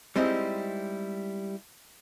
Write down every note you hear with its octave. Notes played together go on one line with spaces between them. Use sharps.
G3 G#3 C4 D#4 E4 G4